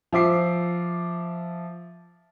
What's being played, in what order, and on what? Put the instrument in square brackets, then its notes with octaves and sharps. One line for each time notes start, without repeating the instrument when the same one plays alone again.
[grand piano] F3 E5 D6 C7